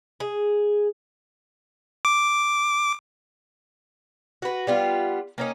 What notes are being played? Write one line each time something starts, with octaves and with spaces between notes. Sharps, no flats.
G#4
D6
F#4 B4
G3 B3 F4
A#3 C#4 D#4